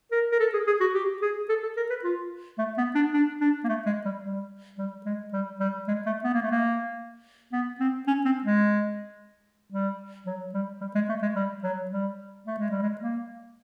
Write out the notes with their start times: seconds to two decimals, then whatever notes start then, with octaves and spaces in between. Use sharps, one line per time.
0.12 A#4
0.32 A#4
0.40 A4
0.54 G#4
0.67 G#4
0.81 F#4
0.94 G4
1.22 G#4
1.49 A4
1.63 A4
1.77 A#4
1.90 B4
2.04 F4
2.59 A3
2.78 B3
2.95 D4
3.14 D4
3.41 D4
3.64 A#3
3.69 A3
3.86 G#3
4.05 G3
4.24 G3
4.78 G3
5.06 G#3
5.33 G3
5.60 G3
5.88 G#3
6.06 A3
6.24 B3
6.34 A#3
6.42 A3
6.51 A#3
7.52 B3
7.80 C4
8.07 C#4
8.25 C4
8.44 G#3
9.72 G3
10.26 F#3
10.54 G3
10.81 G3
10.95 G#3
11.09 A3
11.22 G#3
11.36 G3
11.63 F#3
11.91 G3
12.46 A3
12.58 G#3
12.70 G3
12.83 G#3
13.01 A#3